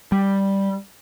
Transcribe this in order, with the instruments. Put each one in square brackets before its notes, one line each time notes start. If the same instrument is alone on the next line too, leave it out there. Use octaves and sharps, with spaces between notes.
[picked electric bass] G3